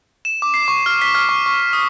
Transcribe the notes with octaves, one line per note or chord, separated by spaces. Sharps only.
E7
D6
C7
C#6
F6
B6
F6
C#6
C#6
D#6